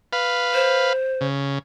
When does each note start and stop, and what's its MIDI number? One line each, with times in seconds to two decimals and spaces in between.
0.13 0.93 71
0.13 0.93 77
0.54 1.26 72
1.21 1.59 49